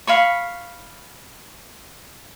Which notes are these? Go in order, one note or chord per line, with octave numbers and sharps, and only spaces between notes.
F5 B5 C#6